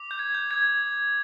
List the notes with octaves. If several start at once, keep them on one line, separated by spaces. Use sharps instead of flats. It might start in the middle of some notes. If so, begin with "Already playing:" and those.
Already playing: D6
G6
G#6
G6
D#6 G6 G#6